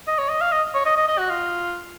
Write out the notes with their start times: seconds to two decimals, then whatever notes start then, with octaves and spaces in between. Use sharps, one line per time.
0.07 D#5
0.18 C#5
0.29 D#5
0.41 F5
0.52 D#5
0.74 C#5
0.85 D#5
0.96 D#5
1.08 D#5
1.18 F#4
1.29 F4